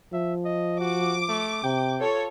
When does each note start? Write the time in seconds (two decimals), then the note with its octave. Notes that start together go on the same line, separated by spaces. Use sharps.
0.13 F3 E5
0.45 D#5
0.80 F#4 D6
1.29 A3
1.64 C3 G5
1.98 F4 A4 C#5